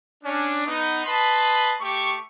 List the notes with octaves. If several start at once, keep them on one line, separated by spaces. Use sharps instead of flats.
C#4 D4
B3 D#4
B4 D#5 A5 B5 C6
A3 G4 C#6